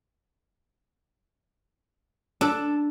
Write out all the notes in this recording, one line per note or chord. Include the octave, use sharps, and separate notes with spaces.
D4 A4